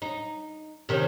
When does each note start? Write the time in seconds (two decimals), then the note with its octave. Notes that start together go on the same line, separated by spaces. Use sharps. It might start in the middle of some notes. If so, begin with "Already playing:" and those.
0.02 D#4
0.89 C3 D#3 C#4